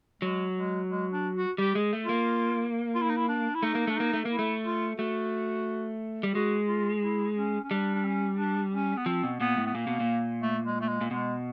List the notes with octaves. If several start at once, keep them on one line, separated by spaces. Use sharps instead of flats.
F#3 G#3
G#3
G#3
D4
F#4
G3 G4
G#3
A3
F4
A#3
F4
E4
D#4
E4
D4
E4
A3 D#4
A#3
A3 D4
A#3 D#4
A3
A#3 E4
A3
F4
A3 F#4
G3
G#3 F#4
F4
E4
C#4
C#4
G3 D4
D4
C#4
D4
C#4
B3
F3 C4
B2
A#2 B3
A2
B3
A#2 A#3
B2
A#2
A3
G#3
A3
G#3
A#2
B2 G#3